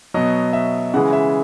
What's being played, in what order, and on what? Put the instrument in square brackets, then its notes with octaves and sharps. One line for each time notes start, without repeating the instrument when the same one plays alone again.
[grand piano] B2 F#3 D#5
E5
C#3 E3 G#3 F#5
E5